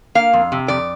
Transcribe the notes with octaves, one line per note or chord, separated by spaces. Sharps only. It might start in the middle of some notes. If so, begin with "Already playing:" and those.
A#3 F5
F2
C3
F2 D5